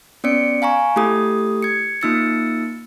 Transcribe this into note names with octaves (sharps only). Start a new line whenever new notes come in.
B3 C#4 D5 C#7 D7
F5 G#5 A#5 C#6
A3 E4 G4 A4 D#6
G#6 C#7
A#3 D#4 F4 E6 A6 C#7